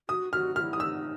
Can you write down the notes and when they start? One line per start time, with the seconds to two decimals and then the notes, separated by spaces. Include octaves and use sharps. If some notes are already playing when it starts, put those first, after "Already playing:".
0.09 F#4 D#6
0.33 F#4 F6
0.56 E4 F#4 F6
0.73 D#6
0.80 D#4 E6